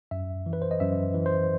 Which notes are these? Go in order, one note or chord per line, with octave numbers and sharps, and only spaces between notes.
F#2 E5
E3
B4
C5
D#5
F#2 E5
E3
C5